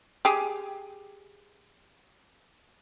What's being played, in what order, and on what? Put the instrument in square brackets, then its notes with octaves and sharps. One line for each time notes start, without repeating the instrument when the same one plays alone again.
[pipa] G4 G#4